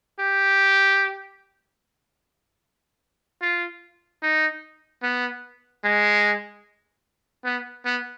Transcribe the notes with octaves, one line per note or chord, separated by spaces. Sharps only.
G4
F4
D#4
B3
G#3
B3
B3